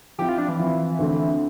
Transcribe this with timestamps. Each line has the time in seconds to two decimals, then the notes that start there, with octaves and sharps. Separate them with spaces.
0.18 F3 C4 E4 G4
0.29 F4
0.38 D4
0.49 E3
0.59 F3 C4 E4
0.99 D2 D3 A3 C4